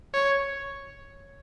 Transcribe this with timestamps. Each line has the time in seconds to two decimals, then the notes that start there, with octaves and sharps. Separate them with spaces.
0.13 C#5